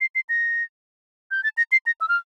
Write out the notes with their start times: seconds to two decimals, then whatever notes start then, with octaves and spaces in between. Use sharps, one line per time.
0.01 C7
0.15 C7
0.29 A#6
1.31 G6
1.44 A6
1.57 A#6
1.72 C7
1.86 A#6
2.01 E6
2.09 F6